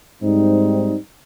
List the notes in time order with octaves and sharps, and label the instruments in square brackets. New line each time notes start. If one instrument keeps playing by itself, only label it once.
[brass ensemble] G#2 G3 C4 D#4